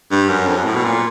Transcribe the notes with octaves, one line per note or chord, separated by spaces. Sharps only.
G2
F#2
F2
F#2
A2
B2
A#2